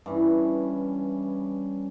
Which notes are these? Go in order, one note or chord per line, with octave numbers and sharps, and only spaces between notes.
G2 E3 C#4